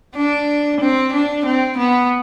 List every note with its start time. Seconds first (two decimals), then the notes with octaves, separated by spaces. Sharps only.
0.15 D4
0.80 C4
1.13 D4
1.46 C4
1.78 B3